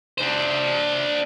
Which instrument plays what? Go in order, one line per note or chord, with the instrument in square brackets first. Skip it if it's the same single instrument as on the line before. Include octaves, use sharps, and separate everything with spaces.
[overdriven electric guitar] D4 C5